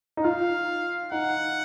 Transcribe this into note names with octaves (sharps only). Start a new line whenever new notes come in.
D#4
F4 F5
D#4 F#5